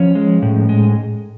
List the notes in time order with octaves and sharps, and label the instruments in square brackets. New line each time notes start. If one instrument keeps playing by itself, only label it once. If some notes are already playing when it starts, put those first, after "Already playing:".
Already playing: [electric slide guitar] F3 C#4 C#5
G#3
A2
G#3